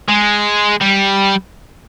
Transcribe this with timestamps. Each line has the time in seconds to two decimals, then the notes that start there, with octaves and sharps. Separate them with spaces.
0.08 G#3
0.81 G3